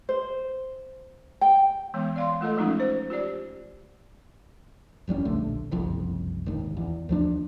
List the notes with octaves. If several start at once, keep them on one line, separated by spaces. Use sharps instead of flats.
C5
G5
E3 G#3 B3
D5 F5 C6
A3 F4 A4 D#5
F3 G#3 A3 C#4 D#4 F4
C5
F4 G4 D5
F#1 E2 G3 C#4
D1 A#1 D3 A3
F#1 C2 F2
G#1 D#2
E2
D2 F3 D4